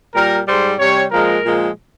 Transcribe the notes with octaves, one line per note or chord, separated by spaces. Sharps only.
A#2 G3 A#4
G#2 G3 C5
C3 G3 C#5
A#2 F3 G#3 A#4
A#2 F3 G#3